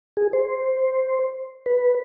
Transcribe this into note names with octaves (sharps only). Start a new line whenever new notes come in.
G#4
C5
B4